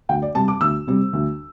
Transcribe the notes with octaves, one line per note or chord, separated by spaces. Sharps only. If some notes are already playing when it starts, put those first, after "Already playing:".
D2 G5
D5
C3 G3 C4 A5
D6
D2 E6
C3 G3 C4
D2